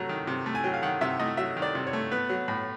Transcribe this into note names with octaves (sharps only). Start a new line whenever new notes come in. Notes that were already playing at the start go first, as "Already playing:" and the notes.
Already playing: C3 F#3 A3 A#5
D#3
C3
A3
G#5
F#3 G5
F5
D#3 F#5
C3 E5
A3 D#5
F#3 E5
D#3
D5
C3
C#5
A3
B3 B4
F#3
A2